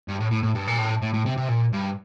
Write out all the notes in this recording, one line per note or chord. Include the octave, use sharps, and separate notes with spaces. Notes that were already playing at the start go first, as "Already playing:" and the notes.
G2
A2
A2
A2
G2
A#2
A2
A2
A2
C3
C3
A#2
G2